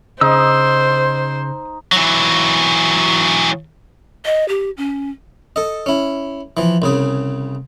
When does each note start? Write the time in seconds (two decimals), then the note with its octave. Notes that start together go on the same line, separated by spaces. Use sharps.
0.21 C#3 D#4 C5 D#6 E6
1.92 E3 F#3
4.25 D#5
4.49 G4
4.77 C#4
5.56 A4 D#5
5.86 C#4 E4
6.57 E3 F3
6.82 C2 C#3 G#4